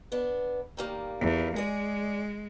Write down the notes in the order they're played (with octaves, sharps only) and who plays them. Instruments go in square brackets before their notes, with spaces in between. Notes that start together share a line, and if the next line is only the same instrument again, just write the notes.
[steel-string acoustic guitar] B3 D4
D#3 G3 A#3
[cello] E2
[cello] G#3 [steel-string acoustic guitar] G#4 D5